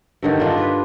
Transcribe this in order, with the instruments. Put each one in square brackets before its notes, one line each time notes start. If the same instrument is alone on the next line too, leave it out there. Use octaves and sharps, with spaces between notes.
[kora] G2 D3 D#3
D4 F4 D#5
B4